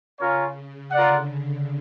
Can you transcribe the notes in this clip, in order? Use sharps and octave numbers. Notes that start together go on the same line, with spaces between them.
C#3 C#4 F4 A#4 C#5
C#3
D3 F4 A#4 D5 F#5